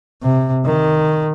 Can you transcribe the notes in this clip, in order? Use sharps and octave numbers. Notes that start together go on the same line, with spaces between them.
C3
D#3